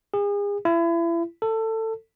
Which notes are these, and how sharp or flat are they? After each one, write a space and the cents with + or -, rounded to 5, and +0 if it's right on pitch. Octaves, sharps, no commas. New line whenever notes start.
G#4 -35
E4 +35
A4 +20